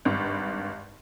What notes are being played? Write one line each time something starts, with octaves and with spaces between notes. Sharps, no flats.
G#1 G2